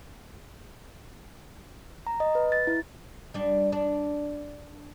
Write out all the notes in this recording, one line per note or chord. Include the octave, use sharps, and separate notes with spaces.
A#5
D#5
B4
A6
E4
G3 D4
D4